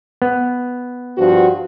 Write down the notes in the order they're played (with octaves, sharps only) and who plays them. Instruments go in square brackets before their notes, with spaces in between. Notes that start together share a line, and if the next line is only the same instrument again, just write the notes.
[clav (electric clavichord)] B3
[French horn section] G2 F3 F#4